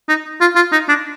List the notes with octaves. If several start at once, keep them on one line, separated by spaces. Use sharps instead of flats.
D#4
F4
F4
D#4
D4